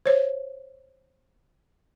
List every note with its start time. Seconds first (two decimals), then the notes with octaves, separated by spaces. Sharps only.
0.06 C5 C#5